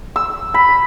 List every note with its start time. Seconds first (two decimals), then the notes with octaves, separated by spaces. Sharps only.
0.16 E6
0.54 B5